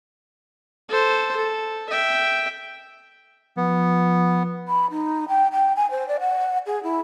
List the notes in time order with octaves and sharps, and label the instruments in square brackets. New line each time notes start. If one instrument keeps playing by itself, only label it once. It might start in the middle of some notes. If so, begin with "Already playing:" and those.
[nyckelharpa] A4 C5
A4
E5 G5
[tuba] F3 [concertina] B3
[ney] B5
D#4
G5
G5
G#5
C5
D5
F#5
G#4
E4